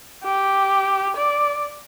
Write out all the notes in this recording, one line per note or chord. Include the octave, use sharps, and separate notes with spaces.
G4
D5